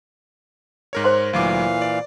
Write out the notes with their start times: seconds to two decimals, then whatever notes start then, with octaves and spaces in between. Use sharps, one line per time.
0.93 G#2 A#4 C#5
1.04 C5 C6
1.33 D2 A#2 E3 F#3 F5 D6
1.82 D5